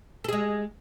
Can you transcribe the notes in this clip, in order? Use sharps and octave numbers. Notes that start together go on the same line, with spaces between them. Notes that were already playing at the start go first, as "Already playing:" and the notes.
G#3 G#4 A4